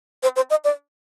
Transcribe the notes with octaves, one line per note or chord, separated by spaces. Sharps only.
C5
C5
D#5
D5